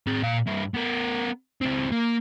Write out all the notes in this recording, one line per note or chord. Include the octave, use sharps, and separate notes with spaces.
C4 G#4
A#2 F5
G2 E4
B3 A#4
C#2 C4
A#3